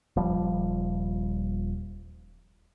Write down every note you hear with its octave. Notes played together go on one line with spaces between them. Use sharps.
D#1 F3 G3